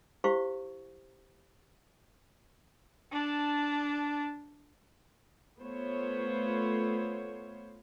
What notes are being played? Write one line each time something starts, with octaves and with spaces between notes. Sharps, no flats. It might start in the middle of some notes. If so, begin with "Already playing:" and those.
E4 G4 C5 F5 C#6
D4 A5
A3 B3 F4 C5 C#5